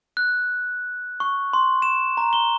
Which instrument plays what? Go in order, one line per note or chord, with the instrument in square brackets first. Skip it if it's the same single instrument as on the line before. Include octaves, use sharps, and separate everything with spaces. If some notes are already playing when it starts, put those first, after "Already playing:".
[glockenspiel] F#6
C#6
C6
E7
A#5
G7